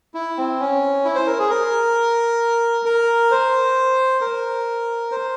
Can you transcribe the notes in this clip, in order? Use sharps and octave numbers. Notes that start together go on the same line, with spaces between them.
E4
C4
C#4
E4
C5
A#4
G#4
A#4
A#4
C5
A#4
C5